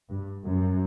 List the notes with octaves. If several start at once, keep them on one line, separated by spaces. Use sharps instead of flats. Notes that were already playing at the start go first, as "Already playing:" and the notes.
G2
F#2